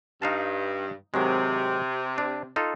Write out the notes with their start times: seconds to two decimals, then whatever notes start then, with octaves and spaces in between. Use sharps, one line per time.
0.22 G2 D#4 F5 A5
1.14 C3 D#3 F#3 G#3
2.18 D4
2.56 D#4 F4 A4